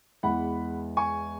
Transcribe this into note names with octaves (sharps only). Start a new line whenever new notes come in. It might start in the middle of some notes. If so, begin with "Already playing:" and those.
E2 E3 G#3 F#5 B5
G#5 C#6